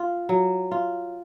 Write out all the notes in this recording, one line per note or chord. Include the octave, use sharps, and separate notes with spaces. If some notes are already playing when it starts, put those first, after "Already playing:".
Already playing: F4
F#3
F4